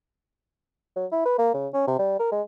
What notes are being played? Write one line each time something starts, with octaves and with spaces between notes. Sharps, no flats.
F#3
E4
B4
A#3
C#3
C#4
C3
G3
A#4
G#3